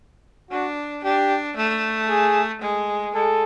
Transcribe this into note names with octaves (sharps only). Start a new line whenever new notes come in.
D4 F#4
D4 G4
A3
G#4
G#3
G#3 A4